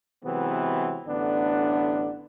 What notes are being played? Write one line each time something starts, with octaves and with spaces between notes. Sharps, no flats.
C3 E3 F#3 G#3 B3 C4
A1 D3 B3 D4